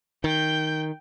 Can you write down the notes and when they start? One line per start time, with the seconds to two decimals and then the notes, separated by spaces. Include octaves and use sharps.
0.24 D#3 G5 G6